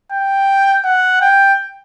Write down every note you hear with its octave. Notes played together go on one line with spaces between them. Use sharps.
G5
F#5
G5